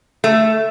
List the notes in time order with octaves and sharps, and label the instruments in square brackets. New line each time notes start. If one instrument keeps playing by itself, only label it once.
[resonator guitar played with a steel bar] A3